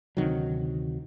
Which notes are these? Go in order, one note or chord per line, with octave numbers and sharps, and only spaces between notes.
D2 C3 D#3 F#3